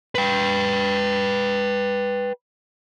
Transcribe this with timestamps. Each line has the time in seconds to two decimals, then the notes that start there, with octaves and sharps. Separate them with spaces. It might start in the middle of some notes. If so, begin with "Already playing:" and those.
0.15 B4 G5